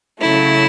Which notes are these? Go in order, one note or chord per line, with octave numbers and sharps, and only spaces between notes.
C#3 F#3 A3 E4